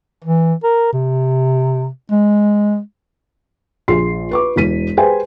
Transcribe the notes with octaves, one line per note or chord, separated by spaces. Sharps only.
E3
A#4
C3
G#3
A#1 G#4 C6 C7
B4 C#6 D6
E1 E3 B6 D#7
G4 G#4 B4 C5 G5 G#5